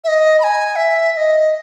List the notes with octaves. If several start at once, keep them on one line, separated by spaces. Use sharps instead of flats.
E5
D#5
B5
G#5
E5
E5
D#5